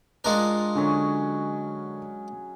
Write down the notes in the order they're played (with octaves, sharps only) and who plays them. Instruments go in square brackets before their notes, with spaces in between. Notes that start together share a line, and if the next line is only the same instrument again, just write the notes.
[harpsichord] G#3 A#4 [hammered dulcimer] D4 F4 D#5
[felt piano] D3 [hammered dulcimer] F#3 C#4 G#4